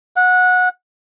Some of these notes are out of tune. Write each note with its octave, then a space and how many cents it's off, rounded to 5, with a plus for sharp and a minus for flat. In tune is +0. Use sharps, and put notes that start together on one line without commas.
F#5 -20